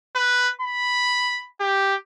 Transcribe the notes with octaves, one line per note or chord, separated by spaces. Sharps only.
B4
B5
G4